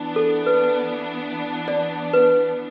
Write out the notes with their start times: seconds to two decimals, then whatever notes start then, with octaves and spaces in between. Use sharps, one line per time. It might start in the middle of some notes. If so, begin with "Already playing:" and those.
Already playing: E3 B3 D4
0.16 A4
0.46 B4
1.68 D5
2.13 B4